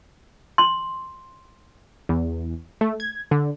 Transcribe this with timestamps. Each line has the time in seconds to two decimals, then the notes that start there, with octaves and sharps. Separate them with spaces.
0.58 C6
2.09 E2
2.81 A3
3.00 G#6
3.31 D3